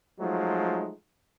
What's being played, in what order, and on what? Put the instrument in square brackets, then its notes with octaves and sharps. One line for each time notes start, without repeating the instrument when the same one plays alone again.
[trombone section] F3 F#3 G#3 A3 D#4